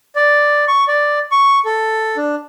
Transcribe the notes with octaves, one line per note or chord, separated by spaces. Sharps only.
D5
C#6
D5
C#6
A4
D4